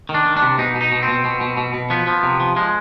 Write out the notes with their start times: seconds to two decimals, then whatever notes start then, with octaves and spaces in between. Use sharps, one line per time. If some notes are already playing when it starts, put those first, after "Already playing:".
0.09 D#3
0.14 D4
0.26 D#3
0.37 D4
0.42 C3
0.58 B2 D#4
0.75 B2
0.81 D#4
0.92 B2
1.02 C4
1.08 B2
1.25 B2
1.41 B2
1.57 B2
1.74 B2
1.90 F3 B3
2.07 F3
2.23 C3
2.40 F3
2.56 F3 G#3